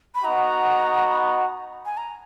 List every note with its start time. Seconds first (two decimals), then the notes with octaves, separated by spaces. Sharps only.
0.15 B5
0.24 B3 D#4 F#4 A#5
1.86 G#5
1.97 A#5